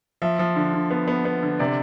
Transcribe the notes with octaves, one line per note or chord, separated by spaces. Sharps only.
F3 E5
F3
D3
D3
B3
B3
B3
D3
C3 D5